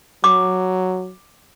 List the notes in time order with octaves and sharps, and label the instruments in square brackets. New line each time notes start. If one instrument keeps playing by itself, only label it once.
[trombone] F#3 [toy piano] D6